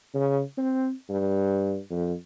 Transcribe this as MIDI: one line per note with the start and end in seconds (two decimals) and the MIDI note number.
0.15 0.42 49
0.58 0.92 60
1.09 1.78 43
1.90 2.13 41